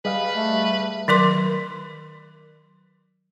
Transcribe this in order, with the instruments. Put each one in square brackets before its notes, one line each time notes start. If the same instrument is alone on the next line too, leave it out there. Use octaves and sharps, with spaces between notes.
[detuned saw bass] G3 [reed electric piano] G#4 D#5 F5 [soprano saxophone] B4
[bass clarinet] A3
[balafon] D#3 F#3 A#4 C6